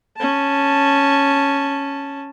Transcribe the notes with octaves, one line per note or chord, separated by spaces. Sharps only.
C#4 A5